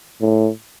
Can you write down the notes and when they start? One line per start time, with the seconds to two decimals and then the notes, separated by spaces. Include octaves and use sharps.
0.21 A2